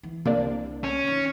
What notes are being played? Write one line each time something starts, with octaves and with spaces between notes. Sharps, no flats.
E3
C2 C3 A#3 D4
C#4
D#3